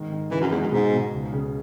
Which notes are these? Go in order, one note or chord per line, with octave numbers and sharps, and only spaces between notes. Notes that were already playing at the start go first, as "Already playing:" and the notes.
Already playing: G#2 D#3
D#3
C#3 E3
F#2
E2 G#3
F#2
G#2 B2
B2
C#2
C#3